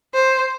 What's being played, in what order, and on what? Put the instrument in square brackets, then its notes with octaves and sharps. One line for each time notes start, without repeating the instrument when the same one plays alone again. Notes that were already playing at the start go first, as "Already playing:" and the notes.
[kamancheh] C5